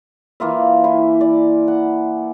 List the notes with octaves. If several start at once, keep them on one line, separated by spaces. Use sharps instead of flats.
E3 A#3 F4 E5
E4 G#5 C6
D5
F#5